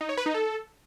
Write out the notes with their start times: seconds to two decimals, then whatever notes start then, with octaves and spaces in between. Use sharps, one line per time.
0.01 D#4
0.09 C#5
0.17 B4
0.26 D#4
0.34 A4